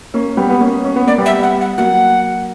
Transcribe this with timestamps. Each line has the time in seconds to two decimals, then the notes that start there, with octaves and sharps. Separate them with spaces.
0.14 A#3 C#4
0.37 G3 B3
0.49 B3
0.60 A#3 C#4
0.85 C#4
0.96 B3
1.07 A#3 D5
1.18 G3 B3
1.26 E5
1.43 F#5
1.61 F#5
1.78 F#3 A#3 F#5